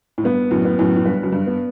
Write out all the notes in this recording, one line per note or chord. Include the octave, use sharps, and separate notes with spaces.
A2
G2 B3
F#2 A2
B3
F#2 A2
A2
G2 B4
F#2
G2
B3